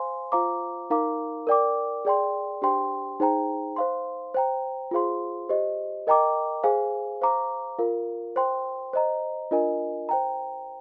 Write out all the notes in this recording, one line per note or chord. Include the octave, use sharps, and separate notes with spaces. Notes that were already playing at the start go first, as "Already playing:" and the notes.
Already playing: C5 F5 G#5 C6
F4 C5 F5 A#5 D6
D#4 A#4 F5 A#5 D6
A#4 D5 G5 D6
G#4 D5 G5 C6
D4 G4 C5 G5 C6
D#4 G#4 C5 G5 A#5
C5 F5 C6
C5 G5 A#5
F4 G#4 C5 F5 C6
G4 C5 D#5
A#4 D#5 G5 A#5 D6
G#4 C5 F5 G#5
C5 F5 A#5 D6
F4 A#4 F5
C5 G5 C6
C5 D#5 A#5
D4 F4 A#4 D#5 G#5
C5 G5 A#5